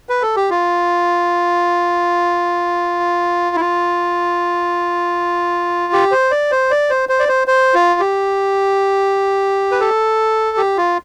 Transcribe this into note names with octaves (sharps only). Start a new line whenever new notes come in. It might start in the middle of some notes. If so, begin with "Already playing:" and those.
B4
A4
G4
F4
E4
F4
G4
C5
D5
C5
D5
C5
C5
D5
C5
C5
F4
G4
B4
A4
G4
F4